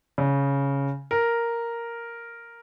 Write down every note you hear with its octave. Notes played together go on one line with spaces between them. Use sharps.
C#3
A#4